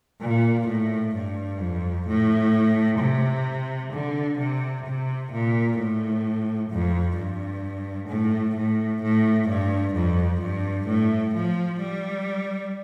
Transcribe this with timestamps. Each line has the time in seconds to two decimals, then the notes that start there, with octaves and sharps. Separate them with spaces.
0.22 A#2
0.67 A2
1.15 G2
1.60 F2
2.07 A2
2.99 C3
3.93 D3
4.38 C3
4.86 C3
5.32 A#2
5.78 A2
6.70 F2
7.17 G2
8.09 A2
8.57 A2
9.02 A2
9.49 G2
9.95 F2
10.41 G2
10.88 A2
11.34 F3
11.80 G3